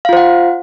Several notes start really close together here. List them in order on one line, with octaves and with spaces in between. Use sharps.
F5 F4 C5 F#5